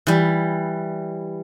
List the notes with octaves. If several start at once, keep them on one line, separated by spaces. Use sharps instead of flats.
E3 G3